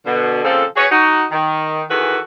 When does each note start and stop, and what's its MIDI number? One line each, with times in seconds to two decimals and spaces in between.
0.06 0.44 47
0.06 0.44 50
0.44 0.65 46
0.44 0.65 49
0.44 0.65 53
0.44 0.65 60
0.44 0.65 69
0.77 0.86 66
0.77 0.86 68
0.77 0.86 71
0.77 0.86 73
0.91 1.25 63
0.91 1.25 66
1.32 1.83 51
1.90 2.18 51
1.90 2.18 52
1.90 2.18 66
1.90 2.18 68
1.90 2.18 69
1.90 2.18 71